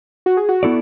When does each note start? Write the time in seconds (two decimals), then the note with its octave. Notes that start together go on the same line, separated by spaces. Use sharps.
0.26 F#4
0.37 G#4
0.49 F#4
0.63 B3 E4 A4 D5